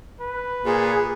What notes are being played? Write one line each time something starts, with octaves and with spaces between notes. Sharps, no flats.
B4
A#2 G#4